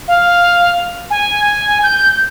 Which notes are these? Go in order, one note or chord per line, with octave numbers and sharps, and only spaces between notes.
F5
G#5
G6